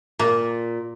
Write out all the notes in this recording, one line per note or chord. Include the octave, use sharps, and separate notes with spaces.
A#2 A#3